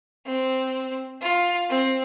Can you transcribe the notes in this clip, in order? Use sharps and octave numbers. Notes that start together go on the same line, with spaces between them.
C4
F4
C4